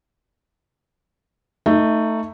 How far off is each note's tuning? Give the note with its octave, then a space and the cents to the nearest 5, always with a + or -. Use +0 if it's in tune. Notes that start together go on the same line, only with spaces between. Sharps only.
A3 +15 D#4 +0